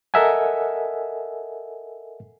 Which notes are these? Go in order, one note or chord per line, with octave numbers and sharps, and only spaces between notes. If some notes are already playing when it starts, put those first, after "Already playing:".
A4 A#4 D#5 E5 F#5 G#5